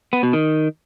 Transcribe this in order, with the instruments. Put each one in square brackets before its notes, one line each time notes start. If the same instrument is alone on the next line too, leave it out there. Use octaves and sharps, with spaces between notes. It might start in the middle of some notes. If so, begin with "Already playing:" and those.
[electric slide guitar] B3
B2
D#3